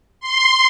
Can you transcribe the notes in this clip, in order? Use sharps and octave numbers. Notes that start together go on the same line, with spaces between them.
C6